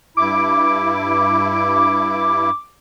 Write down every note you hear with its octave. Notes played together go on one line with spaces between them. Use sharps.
G2 E4 D6